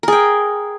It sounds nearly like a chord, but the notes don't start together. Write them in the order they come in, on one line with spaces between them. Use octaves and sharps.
A#4 G#4 G5